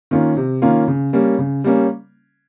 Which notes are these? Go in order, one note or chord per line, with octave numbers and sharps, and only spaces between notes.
D#3 A#3 C#4 F4
C3
D#3 A#3 C#4 F4
C#3
G3 A#3 C#4
C#3
G3 A#3 C#4